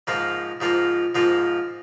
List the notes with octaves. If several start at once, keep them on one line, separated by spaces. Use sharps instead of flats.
G#2 F3 A#3 F4
G#2 F3 A#3 F4
G#2 F3 A#3 F4